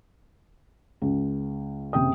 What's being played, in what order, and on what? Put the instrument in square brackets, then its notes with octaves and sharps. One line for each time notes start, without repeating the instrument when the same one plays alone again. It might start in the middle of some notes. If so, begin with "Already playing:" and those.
[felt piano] C#2
F#1 C3 G5 D#6